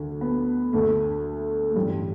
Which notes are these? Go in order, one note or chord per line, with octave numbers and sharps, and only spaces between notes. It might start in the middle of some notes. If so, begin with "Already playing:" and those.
Already playing: D2 D3
B3
D2 D3 A3
A3
A1 G2 D3 G3